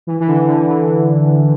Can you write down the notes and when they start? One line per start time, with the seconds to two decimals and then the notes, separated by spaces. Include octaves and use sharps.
0.07 E3
0.20 E3
0.28 D3
0.48 D3
0.68 E3